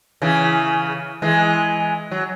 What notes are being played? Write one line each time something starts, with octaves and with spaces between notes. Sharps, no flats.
C#3 E3
E3 G#3
F#3